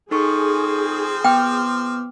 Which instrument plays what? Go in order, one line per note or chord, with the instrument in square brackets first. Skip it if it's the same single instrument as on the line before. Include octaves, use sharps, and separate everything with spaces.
[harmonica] F3 C4 [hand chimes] D#4 A4 C#6 [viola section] G#4
[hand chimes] B3 D6 F6 [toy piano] G5